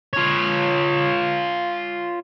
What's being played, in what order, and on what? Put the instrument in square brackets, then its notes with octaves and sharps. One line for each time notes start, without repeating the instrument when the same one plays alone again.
[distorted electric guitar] F4 C#5